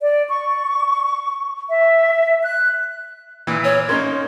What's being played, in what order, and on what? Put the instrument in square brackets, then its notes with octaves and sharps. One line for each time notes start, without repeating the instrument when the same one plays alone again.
[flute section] D5
C#6
E5
F#6
[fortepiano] A#2 E3
[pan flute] C#5
[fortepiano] A#3 C#4 D#4 [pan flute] C6